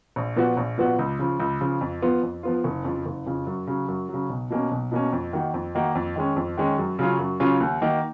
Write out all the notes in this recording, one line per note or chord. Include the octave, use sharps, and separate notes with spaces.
A#1
A#2 F3 B3 F#4
A#1
A#2 F3 B3 F#4
C#2
C#3 F3
C#2
C#3 F3
F2
F3 B3 F4
F2
F3 B3 F4
F#1
F2 C#3 F3
F#1
F2 C#3 F3
F#2
C#3 F#3
F#2
C#3 F#3
B1
B2 A#3 C#4
B1
B2 A#3 C#4
F2
D#3 A#3 D#4 F#4
F2
D#3 A#3 D#4 F#4
F2
D#3 G#3 C#4
F2
D#3 G#3 C#4
F#2
C#3 F#3 C#4 F4
F#2
C#3 F#3 C#4 F4
D#2
D#3 A#3 D#4 F#4